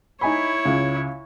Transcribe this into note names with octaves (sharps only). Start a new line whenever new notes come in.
D#4 E4 C#5 G#5 B5
C#2 C#3